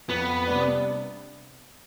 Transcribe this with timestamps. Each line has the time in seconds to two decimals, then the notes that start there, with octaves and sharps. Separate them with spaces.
0.09 F2 B3
0.47 C3 G3 D4